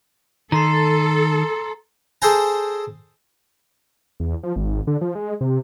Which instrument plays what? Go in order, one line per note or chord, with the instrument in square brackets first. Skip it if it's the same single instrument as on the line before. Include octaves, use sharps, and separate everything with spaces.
[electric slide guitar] D#3 [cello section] A4 [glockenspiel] A#5 C6 C7
[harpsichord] G#4 A4 C5 G5 G#5 A#5
[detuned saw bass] E2
F3
G#1
D3
F3
G#3
C3